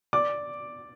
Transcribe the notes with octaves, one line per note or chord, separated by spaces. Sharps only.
D5 D6